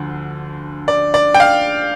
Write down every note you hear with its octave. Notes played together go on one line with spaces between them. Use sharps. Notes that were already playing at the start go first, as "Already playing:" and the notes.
Already playing: D2 D3 F3
D5
D5
G5
F5